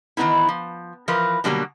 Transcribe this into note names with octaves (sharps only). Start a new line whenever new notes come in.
D#3 E3 A3 B3 D#4 E4
F3
E3 F3 A#4 B4
B2 D3 F#3 G3 A#3 F#4